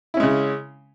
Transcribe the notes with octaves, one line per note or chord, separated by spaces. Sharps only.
C#3 G#3 C#4 E4